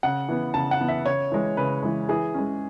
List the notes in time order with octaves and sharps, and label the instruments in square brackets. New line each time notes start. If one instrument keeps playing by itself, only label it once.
[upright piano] C#3 F#5
E3 B3
C#3 A5
F#5
E3 B3
E5
C#3 C#5
E3 G#3
C#3 B4
E3 G#3
E3 G#4
G#3 C#4